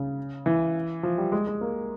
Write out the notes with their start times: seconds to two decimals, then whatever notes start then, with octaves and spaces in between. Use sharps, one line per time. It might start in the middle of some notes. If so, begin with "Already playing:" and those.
Already playing: C#3
0.46 E3
1.03 F3
1.18 G3
1.32 G#3
1.47 G#3
1.61 A#3